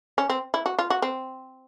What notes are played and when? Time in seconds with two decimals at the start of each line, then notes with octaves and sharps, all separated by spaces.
0.18 C#4
0.30 C4
0.54 E4
0.66 F#4
0.79 F4
0.90 F#4
1.02 C4